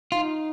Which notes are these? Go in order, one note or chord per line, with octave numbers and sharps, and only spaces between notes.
D#4 F4